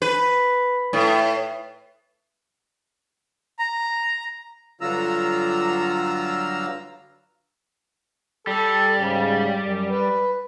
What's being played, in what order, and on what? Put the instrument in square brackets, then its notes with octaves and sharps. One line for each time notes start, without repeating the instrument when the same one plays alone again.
[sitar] B4
A2
[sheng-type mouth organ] A#5
[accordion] G2 D3 F#3 F4 A#5 E6
[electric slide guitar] G3 [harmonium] A4
[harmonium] G#2 C#3
F#2
B4